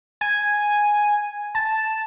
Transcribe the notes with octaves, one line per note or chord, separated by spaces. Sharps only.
G#5
A5